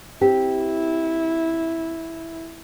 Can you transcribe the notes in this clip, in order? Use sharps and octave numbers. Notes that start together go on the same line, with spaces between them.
C4 E4 G4